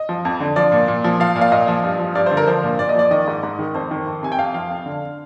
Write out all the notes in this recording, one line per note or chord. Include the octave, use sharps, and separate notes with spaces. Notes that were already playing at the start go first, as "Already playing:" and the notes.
Already playing: D#5
F3
F2
D3
F3 D5
A#2
A#2
F3
F3 F5
A#2
F5
A#2 D#5
F3
G2
F3
G2 D5
C5
D3
A#4
F3 C5
A#2
A#2 D5
D#5
F3 D5
D#3 D#5
G#2
G#2
D#3
F2 C5
D#3
F2
C3 G#5
G5
F2 F5
F3 F5
F2
D3